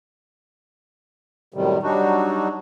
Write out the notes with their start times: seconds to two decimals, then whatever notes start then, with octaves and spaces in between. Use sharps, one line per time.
1.54 F#2 A2 C3 D#3 G3
1.83 F#3 G3 D4 D#4 F#4